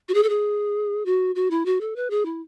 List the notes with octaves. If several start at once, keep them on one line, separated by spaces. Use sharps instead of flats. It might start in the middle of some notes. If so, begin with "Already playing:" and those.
F#4
G#4
A4
G#4
F#4
F#4
E4
F#4
A4
B4
G#4
E4